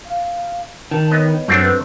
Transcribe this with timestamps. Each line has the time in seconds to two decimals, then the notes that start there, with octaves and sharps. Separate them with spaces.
0.06 F5
0.91 D#3 A5
1.11 B3 C#5 D#5
1.48 F#2 A3 C4 D4
1.60 B4